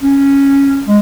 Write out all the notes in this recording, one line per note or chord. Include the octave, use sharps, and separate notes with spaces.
C#4
G#3